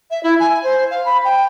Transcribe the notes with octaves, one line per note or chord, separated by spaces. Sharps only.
E5
E4
G#5
C5
F5
B5
G5